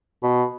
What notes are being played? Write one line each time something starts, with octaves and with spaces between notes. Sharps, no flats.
B2